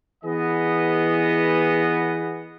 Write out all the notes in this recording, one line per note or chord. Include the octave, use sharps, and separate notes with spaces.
E3 B3 G#4 D#5